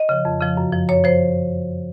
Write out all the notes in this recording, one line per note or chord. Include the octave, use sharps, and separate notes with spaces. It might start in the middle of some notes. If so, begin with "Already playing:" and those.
Already playing: D#5
C#3 F3
F2
C#3 F3
F#2
F3
F#2 C#5
F3 C5